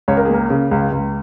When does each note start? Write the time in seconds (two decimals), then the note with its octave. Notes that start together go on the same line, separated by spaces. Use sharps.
0.08 C#2 C#5
0.17 A#4
0.25 G#4
0.29 A#3
0.34 A#4
0.50 C#3
0.71 C#2
0.92 C#2